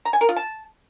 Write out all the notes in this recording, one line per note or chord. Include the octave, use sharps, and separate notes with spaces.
A#5
G#5
A#4
F4
A5